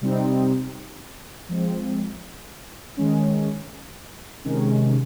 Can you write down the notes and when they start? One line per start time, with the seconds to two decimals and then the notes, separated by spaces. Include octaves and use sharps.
0.01 C3 G3 C4 D#4
1.49 F3 G#3 C4
2.97 D#3 G#3 C#4
4.45 C3 D#3 G#3 C#4